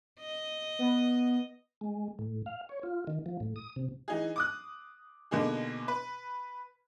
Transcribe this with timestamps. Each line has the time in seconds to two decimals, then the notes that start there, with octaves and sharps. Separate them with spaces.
0.20 D#5
0.79 B3
1.81 G#3
2.19 A2
2.46 F5
2.69 C#5
2.83 F4
3.07 D#3
3.26 F3
3.40 A2
3.56 D#6
3.76 C3
4.08 E3 D#4 G#4
4.36 D6 D#6 F#6
5.31 B2 D3 A#3 D#4 G#4
5.88 B4